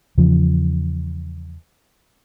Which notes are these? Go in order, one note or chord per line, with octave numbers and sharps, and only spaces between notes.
E2 C#3 F3